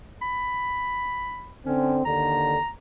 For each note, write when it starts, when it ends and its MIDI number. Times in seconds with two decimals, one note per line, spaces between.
0.22 1.53 83
1.66 2.05 50
1.66 2.05 60
1.66 1.97 61
2.05 2.57 39
2.05 2.57 50
2.05 2.69 82